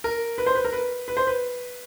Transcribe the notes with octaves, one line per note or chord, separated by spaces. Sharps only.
A#4
B4
C5
B4
A#4
B4
B4
C5
B4